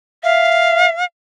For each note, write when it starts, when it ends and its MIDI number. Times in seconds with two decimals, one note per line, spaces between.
0.23 0.91 76
0.23 1.04 77